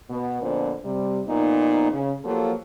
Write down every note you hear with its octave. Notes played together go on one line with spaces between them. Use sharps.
B2 B3
F2 A#2 D3 B3 C5
C3 G3
F2 A#2 B3 D#4
C#3 C#4
F3 F#3 A#3 F4 G4 A4